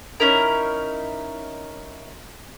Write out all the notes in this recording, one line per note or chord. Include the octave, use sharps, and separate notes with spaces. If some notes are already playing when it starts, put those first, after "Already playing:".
C#4 D#4 E4 A#4